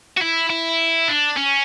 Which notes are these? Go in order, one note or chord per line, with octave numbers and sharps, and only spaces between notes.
F#4
E4
E4
D4
C#4